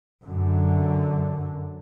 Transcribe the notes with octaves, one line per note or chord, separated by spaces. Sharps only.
F#2 D3